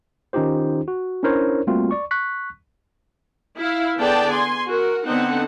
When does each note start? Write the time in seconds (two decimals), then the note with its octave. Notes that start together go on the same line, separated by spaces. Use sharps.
0.33 D#3 C#4 D#4 F4 G4 C5
0.88 F#4
1.23 C#4 D4 E4 A#4 C5 C#5
1.67 G3 A3 A#3 C4 F4 F#4
1.91 D5 C#6
2.11 C#6 F#6 B6
3.58 E4 F5
3.97 D3 B3 G#4 D5 G5 A5
4.30 G#5 C6
4.67 F#4 A#4
5.05 D3 B3 C4 D#4 F#5